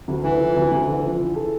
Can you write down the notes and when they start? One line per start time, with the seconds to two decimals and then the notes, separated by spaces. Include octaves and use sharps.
0.08 D2
0.23 D3 E3
0.39 F3
0.56 D2
0.72 D2
0.87 D3
1.04 F3
1.20 E3
1.35 A4